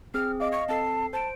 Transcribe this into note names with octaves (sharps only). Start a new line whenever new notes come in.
C4 G#4 F6
D#5 F5 D6
C#6
C4 A4 A5 C7
C5 A5 D7